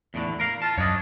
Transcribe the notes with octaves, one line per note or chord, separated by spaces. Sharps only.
E2 A2 D3
A#4 F5
F4 A5
F#2 D4 C#5 D#5